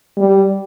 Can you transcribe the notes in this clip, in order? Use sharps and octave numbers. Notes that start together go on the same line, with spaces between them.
G3